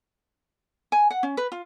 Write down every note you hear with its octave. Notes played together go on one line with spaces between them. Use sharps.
G#5
F#5
C#4
B4
F4